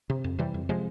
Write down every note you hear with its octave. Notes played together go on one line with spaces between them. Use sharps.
C3
F2
C3 E3 G3
F2
C3 F3 G#3